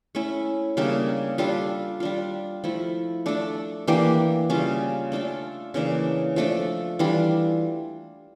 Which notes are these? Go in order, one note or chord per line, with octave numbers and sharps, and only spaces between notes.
A3 C#4 E4
C#3 G3 A#3 D4
G3 D4 F4 A4
G3 D4 F4
F3 A3 E4
A3 D4 A4
E3 A#3 D4 G4
C#3 G3 C#4 F4
A3 D4 F4 A4
C#3 E3 A#3 D4
F3 A3 D4 A4
E3 G3 D4 F4